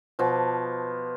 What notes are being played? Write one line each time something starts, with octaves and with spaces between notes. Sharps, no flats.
B2 F3